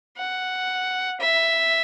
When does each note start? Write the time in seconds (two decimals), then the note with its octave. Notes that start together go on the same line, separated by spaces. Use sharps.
0.18 F#5
1.21 E5